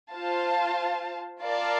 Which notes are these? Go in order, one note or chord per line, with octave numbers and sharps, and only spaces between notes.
F4 C5 F5 A5
F4 A#4 D5 F5 A5